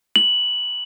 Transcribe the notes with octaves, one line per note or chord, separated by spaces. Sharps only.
F#7